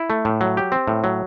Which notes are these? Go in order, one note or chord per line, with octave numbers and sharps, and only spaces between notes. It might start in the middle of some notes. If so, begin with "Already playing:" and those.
Already playing: E4
A3
A2
F#3
G4
C4
A2
F#3